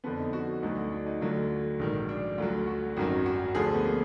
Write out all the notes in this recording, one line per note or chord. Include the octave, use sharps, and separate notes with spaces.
F2 D3 F3 B3
D#4
F#4
D2 D3 F#3 D#4
D4
D#4
D2 D3 F#3 F4
A#1 G#2 D#3 F#3
D4
D2 D3 F#3 F4
F#4
G#1 F#2 D#3 F#3 F#4
F#4
D2 D3 F3 G#4
B3
A#3